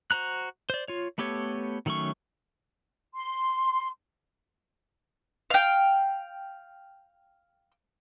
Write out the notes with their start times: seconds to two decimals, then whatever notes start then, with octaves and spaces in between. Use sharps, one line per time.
0.11 F#4 C5 A#5 F#6
0.70 C5 D5
0.88 F4 C#5
1.18 A3 B3 G4 A4 C#5
1.86 D#3 F#3 A3 C#4 C#6
3.14 C6
5.50 F5 G5